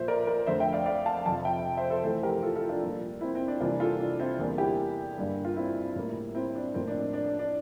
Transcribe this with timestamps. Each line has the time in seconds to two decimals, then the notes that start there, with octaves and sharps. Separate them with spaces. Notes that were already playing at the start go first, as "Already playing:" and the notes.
Already playing: A#2 F3 A#3 C5 E5
0.08 A#4 D5
0.27 A#4 D5
0.46 F2 D3 A3 C5 E5
0.60 E5 G5
0.73 D5 F5
0.86 D5 F5
1.06 F5 A5
1.25 F2 C3 F3 F5 A5
1.44 E5 G5
1.77 C5 E5
1.90 A4 C5
2.04 F2 E3 A3 A4 C5
2.23 G4 A#4
2.43 F4 A4
2.56 F4 A4
2.69 D4 F4
2.83 A#2 G3 A#3
3.21 C4 E4
3.35 C4
3.48 D4
3.60 C3 E3 G3 A#3 D4 F4
3.80 F4 A4
4.00 D4
4.19 C4 E4
4.39 E2 D3 G3 A#3 D4
4.58 E4 G4
5.18 G2 D3 G3 A#3
5.45 F4
5.56 C4 E4
5.96 A2 G3 A#3
6.35 C4 E4
6.55 D4
6.74 A2 F3 A#3 C4
6.87 D4
7.00 D4
7.13 D4
7.26 D4
7.39 D4